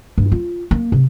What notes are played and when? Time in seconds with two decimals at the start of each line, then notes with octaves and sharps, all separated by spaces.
0.18 G2
0.32 F4
0.71 A#3
0.92 C3